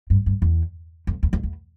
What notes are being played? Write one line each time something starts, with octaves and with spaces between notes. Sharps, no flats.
G2
G2
E2
F2
E2
F2
E2